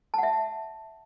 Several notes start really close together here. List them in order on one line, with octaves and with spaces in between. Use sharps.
A5 F#5 E5